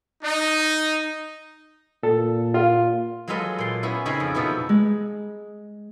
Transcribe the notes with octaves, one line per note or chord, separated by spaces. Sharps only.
D#4
A#2 A4
F4
F#3 G#3 F4 A4 B4 D#5
A#2 C6
B3 C#4 E4
C#3 C4 D#4 D#5 G#5 B5
F2
B2 F3 B3 E4 A4
G#3